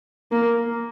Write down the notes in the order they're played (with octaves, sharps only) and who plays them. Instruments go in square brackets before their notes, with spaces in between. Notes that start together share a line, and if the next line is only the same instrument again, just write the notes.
[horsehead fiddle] A#3